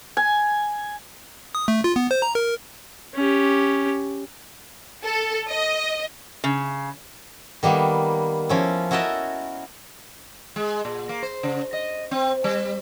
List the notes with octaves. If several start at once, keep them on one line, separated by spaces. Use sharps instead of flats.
G#5
D#6
A3
F4
B3
C5
A#5
A#4
C#4 G4
A4
D#5
C#3
D#3 G3 A#3 B3
F3 C#4 E4
E4 F#4 A#4 D#5 E5 A5
G#3
A#2
A#3
C5
C#3
D#5
C4
G3